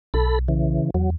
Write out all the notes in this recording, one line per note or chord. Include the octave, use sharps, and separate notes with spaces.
B1 A4 B5
C#3 E3
E2 F#3